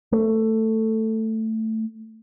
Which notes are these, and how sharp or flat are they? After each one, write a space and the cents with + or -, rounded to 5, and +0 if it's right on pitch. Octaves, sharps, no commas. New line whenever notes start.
A3 +10